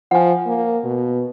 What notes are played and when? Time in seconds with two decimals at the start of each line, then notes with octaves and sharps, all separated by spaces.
0.11 F3 F#5 G#5
0.46 A#3
0.84 B2